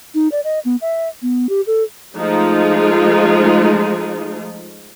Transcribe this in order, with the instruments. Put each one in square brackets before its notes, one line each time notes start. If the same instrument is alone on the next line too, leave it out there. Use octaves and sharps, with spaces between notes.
[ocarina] D#4
D5
D#5
B3
E5
B3
G4
A4
[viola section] F3 G#3 A3 D#4 F4